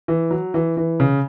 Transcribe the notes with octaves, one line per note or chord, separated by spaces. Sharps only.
E3
F#3
E3
E3
C#3